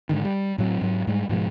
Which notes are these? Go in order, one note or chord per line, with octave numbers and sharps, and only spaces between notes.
G#2 D3 D#3
G3
A2 F#3 C4
G#2 F#3
G#2 G3 G#3
G#2 B2 F3 G#3